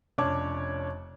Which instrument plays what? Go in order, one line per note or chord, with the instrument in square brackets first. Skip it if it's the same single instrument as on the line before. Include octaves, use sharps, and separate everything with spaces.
[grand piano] F1 C#4 D4 C#5 A5 D6